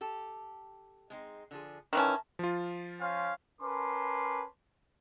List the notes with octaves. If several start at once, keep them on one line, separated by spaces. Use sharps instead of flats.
G4 A4
G#3 C4 D#4
D3 F3 G#4
D#3 E3 C#4 A#4 E5 A5
F3 F4
C#4 C5 F5
C#4 A#4 B4 A5 C6 D6